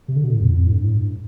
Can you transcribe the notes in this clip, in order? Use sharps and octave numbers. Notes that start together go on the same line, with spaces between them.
C3
D3
B2
A2
F2
F2
A2
G2
A2
G2